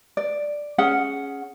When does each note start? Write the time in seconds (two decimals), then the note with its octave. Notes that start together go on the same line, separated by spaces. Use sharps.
0.17 D5
0.78 C#4 G#4 F#5